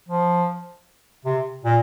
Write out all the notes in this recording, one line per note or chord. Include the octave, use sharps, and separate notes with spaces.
F3
C3
A#2